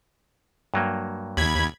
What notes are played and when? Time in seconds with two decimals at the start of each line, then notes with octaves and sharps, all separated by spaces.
0.74 G2 F#3 A#3
1.37 D#2 B5 G#6